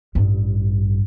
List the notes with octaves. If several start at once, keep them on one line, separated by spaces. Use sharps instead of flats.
A1 G2